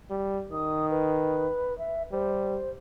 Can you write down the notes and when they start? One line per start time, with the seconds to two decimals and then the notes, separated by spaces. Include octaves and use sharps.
0.11 G3
0.52 D#3 D#6
0.90 B4
1.78 E5
2.12 G3 C5